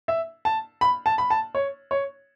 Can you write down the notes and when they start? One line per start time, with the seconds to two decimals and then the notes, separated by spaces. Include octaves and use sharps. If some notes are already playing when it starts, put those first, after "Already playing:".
0.08 E5
0.45 A5
0.81 B5
1.06 A5
1.18 B5
1.30 A5
1.55 C#5
1.91 C#5